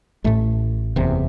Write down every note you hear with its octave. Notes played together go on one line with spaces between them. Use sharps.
A1 A2 A3
F#1 E2 C3